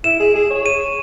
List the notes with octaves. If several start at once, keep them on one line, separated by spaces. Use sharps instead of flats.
E4 E7
G#4
G#4
C#5
D#7